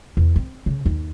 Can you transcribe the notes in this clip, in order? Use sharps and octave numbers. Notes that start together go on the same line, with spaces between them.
E2
C4
C#3
D#2